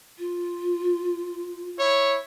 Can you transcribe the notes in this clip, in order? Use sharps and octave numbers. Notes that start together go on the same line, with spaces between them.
F4
E4 C#5